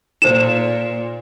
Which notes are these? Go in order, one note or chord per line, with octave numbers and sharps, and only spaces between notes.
A#2 D#4 A4 C5 E7